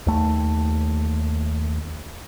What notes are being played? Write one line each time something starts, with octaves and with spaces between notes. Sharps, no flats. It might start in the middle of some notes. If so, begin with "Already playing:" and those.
D#2 A3